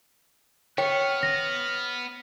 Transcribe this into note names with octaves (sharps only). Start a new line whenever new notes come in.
B3 C#5 G5 F6
A#6